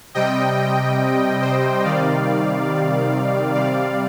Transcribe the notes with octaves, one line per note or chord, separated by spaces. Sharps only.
C3 G3 D#5 G5
C5 D#5
C3 D#3 G3 D5 F5
C3 G3 D5 F5